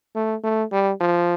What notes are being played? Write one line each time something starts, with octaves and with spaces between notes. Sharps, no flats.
A3
A3
G3
F3